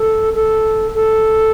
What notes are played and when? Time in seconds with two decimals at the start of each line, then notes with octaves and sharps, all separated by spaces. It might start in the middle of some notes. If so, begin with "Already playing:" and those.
Already playing: A4
0.35 A4
0.95 A4